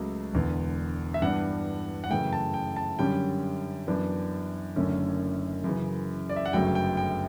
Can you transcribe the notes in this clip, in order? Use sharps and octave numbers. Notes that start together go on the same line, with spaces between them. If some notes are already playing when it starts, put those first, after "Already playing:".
Already playing: C#2 C#3 F#3 A3
E1 E2 D3
E5
G2 E3 B3 D4 F#5
F#5
F#2 C#3 E3 A3 G5
A5
G5
A5
F#2 D3 G3 C#4 G5
F#2 E3 B3 D4
F#1 F#2 D3 A3 C#4
F#2 C#3 E3
D5
E5
F#5
G1 F#2 C#3 F#3 A3 G5
G5
G5